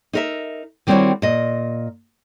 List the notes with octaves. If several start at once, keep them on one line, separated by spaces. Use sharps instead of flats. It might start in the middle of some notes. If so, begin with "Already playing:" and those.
D#4 A#4 E5
D#3 G3 C4 E4 F#4 C#5
A#2 D#5